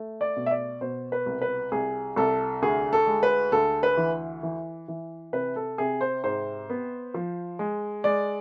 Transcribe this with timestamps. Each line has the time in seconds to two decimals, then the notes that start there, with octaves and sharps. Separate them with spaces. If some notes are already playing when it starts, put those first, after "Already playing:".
Already playing: A3
0.21 D5
0.36 B2
0.46 E5
0.51 D5
0.81 B2 C5
1.12 B4
1.26 C2
1.41 B4
1.72 C2 G#4
2.16 C2 A4
2.62 D2 G#4
2.93 A4
3.07 G#3
3.23 B4
3.52 D2 A4
3.83 B4
3.97 E3
4.43 E3
4.88 E3
5.33 C3 B4
5.56 A4
5.78 C3 G#4
6.01 C5
6.24 G#2 C5
6.70 B3
7.14 F3
7.59 G#3
8.04 G#3 D5